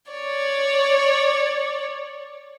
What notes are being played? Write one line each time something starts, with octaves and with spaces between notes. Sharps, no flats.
C#5 D5